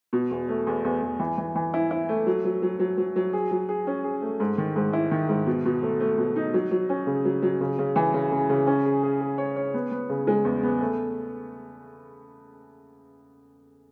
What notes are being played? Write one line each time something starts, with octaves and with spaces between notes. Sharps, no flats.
B2
E2
A3
E2
E2
E2
E3
E3
E3
E4
E4
A3
F#3
F#3
F#3
F#3
F#3
F#3
G#4
F#3
G#4
C#4
G#4
A3
G#2
D#3
G#2
E4
D#3
G#2
B2
B2
A3
A3
B2
D#4
F#3
F#3
C#4
C#3
F#3
F#3
C#3
C#3
E3
C#3
C#3
C#3
C#4
G#4
G#4
G#4
C#5
C#5
B3
B3
C#3
G#3
E2
B3
A3